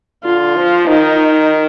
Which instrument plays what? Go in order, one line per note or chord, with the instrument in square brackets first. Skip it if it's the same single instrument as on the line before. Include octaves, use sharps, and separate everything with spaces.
[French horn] D3 [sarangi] F4
[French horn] F3
[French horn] D#3 [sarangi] D#4